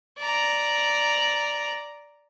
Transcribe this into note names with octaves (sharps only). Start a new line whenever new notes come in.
D5 A#5